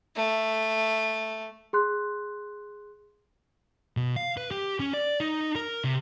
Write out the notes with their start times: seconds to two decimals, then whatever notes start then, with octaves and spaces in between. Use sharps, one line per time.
0.16 A3
1.73 G#4 C6 F#6
3.97 B2
4.16 F5
4.37 B4
4.51 G4
4.80 C#4
4.93 D5
5.20 D#4
5.55 A#4
5.84 C3